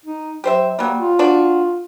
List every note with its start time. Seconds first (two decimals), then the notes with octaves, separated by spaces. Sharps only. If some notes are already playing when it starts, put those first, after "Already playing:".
0.06 D#4
0.44 F#3 G4 C5 E5
0.79 F#3 G3 A#3
0.98 F4
1.19 D4 F#4